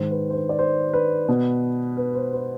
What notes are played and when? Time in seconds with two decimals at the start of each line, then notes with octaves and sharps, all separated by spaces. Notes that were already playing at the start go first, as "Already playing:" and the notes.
Already playing: G#2 D#3 C5
0.11 B4
0.30 C5
0.35 B4
0.49 D5
0.59 C5
0.93 B4
1.28 B2
1.97 B4
2.15 C5
2.33 C5